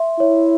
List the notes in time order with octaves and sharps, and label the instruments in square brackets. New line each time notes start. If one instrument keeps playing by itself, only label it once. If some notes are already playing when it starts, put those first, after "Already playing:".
Already playing: [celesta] E5 C6
[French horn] E4 [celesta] C#5